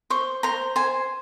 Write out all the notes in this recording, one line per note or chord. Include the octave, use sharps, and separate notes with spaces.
C5 C#6
C5 A#5
C5 G#5